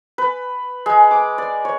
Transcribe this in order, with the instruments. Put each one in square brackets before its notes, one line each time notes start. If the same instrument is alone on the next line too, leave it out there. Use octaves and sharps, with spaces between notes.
[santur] B4
G#3
D6
D5
C#5